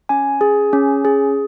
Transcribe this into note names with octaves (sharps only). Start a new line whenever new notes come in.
C#4 G#5
G#4
C#4
G#4